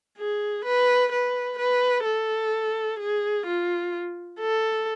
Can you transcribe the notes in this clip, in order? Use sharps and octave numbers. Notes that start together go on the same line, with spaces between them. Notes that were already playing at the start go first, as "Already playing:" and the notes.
G#4
B4
B4
B4
A4
G#4
F4
A4